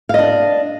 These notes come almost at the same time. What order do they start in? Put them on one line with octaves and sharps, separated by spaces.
F5 D#5 D4